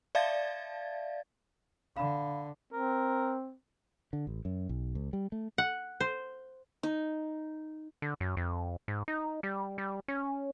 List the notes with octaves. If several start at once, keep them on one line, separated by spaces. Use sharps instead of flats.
D5 E5 F5 A5 G#6 A6
D3 F5 B5
C4 A#4
D3
A1
F#2
B1
C#2
G3
A3
F#5
C5
D#4
D3
F#2
F2
G#2
D#4
G3
G3
C#4